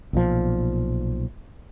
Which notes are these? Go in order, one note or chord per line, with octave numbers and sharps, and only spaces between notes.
B1 A#2 D#3 F3